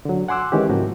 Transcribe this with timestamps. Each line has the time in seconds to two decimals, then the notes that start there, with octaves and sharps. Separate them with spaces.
0.05 D3 F#3
0.28 F#5 G#5 C6 D6 E6 F#6
0.52 D#3 E3 G#3 C#4 G4
0.69 G#2 C#3 F3 A#3 F#4